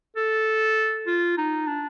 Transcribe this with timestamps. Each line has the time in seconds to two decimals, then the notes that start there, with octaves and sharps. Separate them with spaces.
0.16 A4
1.07 F4
1.37 D#4
1.67 D4